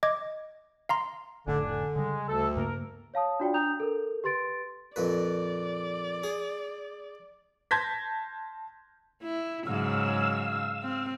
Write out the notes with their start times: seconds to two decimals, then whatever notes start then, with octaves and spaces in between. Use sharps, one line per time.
0.03 D#5 D6 G#6
0.89 F5 A#5 C6
1.47 F1 A2 D3 D4 G#5
1.64 D3
1.96 C#3 G3 G#3
2.28 D2 A4
2.56 G2 C#3 A#3 A#4
3.14 C#5 F5 A5 D#6
3.40 D4 F4 F#4 D5 G5
3.54 D4 A#5 D#6 G6 F7
3.80 A4 A#4
4.24 G4 B4 C6 A6 D7
4.96 F2 A#2 B4 D5
6.24 G#4
7.71 A5 C6 G6 G#6 A#6 B6
9.23 E4
9.67 G#2 C#3 F#3 F5 E6
10.83 C4